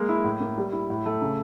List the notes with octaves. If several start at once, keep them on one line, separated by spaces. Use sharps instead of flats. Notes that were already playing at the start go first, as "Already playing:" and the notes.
Already playing: G#3 A#3
E4
A2
A#3
G3
E4
A2
A3
C#3